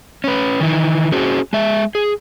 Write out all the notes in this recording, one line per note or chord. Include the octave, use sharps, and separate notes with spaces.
C#4 B4
D#3 E3 D#4
C#4 F#4 G#4 C5
G#3 E5
G#4